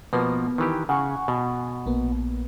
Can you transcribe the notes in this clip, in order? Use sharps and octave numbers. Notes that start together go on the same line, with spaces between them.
B2 F3 A#3 B3 B4
D#3 E3 G4
C#3 F#5 G#5 C#6
B2
A#1 A#3 B3